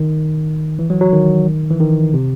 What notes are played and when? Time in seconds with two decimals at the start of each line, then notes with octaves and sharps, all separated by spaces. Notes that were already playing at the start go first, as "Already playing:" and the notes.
Already playing: D#3
0.79 E3
0.90 F#3
1.01 F#3
1.12 D#3
1.70 E3
1.80 D#3
2.14 C3